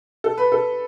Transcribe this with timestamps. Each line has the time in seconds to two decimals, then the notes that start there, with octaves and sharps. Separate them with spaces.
0.24 A4
0.38 B4
0.52 A4